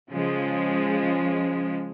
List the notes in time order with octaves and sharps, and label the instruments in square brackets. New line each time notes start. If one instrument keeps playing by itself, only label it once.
[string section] C#3 F3 G#3